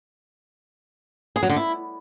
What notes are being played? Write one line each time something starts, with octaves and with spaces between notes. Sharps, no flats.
G#4
F#3
D3
E4